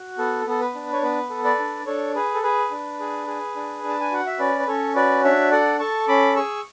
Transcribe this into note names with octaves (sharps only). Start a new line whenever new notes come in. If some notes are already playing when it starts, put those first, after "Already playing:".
Already playing: F#4
B3 A4
B3 A4
B4
D4
C#5
B3 B4
A4
B4 D5
D4
D4 A4 C#5
G#4 B4
A4
G#4 B4
D4
G#4
G#4
D4
D4
A5
G#5
F#4 F#5
E5
C#4 B4 D5
B4
C#4 A4 C#5
F#4 B4 D5
D4 C#5 E5
A4 D5 F#5
A4 A5 C#6
C#4 B5 D6
G#4 C#6 E6